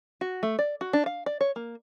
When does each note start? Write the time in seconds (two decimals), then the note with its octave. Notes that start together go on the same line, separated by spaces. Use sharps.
0.21 F#4
0.43 A3
0.59 D5
0.81 F#4
0.93 D4
1.06 F5
1.26 D5
1.41 C#5
1.56 A#3